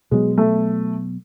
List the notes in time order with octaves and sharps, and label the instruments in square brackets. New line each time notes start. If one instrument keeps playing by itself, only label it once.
[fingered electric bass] B2 F#3 B3 [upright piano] G#3
[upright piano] A3